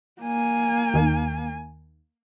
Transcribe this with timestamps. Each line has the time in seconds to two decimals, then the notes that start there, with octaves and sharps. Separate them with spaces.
0.22 A#3 G#5
0.94 D#2 D#3